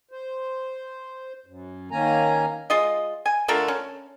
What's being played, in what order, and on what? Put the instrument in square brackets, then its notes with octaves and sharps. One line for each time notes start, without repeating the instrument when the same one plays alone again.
[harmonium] C5
F#2
D#3 A#3 C#4 G#5 A#5
[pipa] G#3 F4 D#5
G#5
D3 A3 F4 A#4
C#4